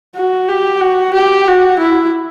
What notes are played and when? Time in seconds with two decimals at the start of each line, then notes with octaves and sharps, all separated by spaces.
0.15 F#4
0.48 G4
0.81 F#4
1.14 G4
1.47 F#4
1.79 E4